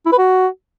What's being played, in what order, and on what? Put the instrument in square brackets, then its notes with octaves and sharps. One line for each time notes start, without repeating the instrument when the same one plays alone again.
[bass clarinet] E4
B4
F#4